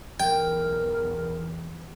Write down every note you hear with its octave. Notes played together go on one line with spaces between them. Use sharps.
B1 E2 A#4 G5